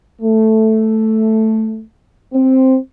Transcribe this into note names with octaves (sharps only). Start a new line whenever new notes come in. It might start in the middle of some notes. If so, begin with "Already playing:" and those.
A3
C4